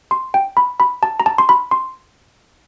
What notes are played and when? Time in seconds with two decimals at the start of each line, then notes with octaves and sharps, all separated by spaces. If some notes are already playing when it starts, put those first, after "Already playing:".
0.11 C6
0.34 G5
0.57 B5
0.80 B5
1.03 A5
1.20 A#5
1.26 A5
1.38 C6
1.49 B5
1.71 C6